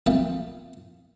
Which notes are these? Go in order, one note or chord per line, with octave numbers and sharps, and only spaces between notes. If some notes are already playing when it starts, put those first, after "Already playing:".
B1 F2 A3 A#3 A5